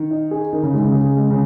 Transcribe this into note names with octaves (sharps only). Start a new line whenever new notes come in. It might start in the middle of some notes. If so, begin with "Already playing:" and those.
Already playing: D#3
D#4
G#4
D#3 A#4
C#3
D#3 G#3
C#3
G#4
G#3
C#3